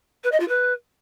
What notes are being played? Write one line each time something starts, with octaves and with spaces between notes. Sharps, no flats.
B4
D#5
F4
B4